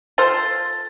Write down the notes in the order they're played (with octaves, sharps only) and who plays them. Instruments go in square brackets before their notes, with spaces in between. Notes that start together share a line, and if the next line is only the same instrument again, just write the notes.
[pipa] F4 A4 C5 [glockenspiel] A6